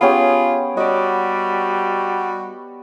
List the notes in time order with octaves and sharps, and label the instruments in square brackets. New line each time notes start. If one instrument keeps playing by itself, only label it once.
[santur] B3 C#4 G4 [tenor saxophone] F4 [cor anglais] G#4
[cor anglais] G3 [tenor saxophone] F#4 [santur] D5 D#5